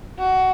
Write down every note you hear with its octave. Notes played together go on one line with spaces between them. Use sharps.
F#4